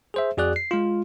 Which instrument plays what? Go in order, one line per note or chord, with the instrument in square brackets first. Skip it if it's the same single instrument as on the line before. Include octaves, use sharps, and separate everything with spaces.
[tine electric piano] G#4 C5 E5
F2 F#4 G#4 D5 F#6
C7
G#3 F4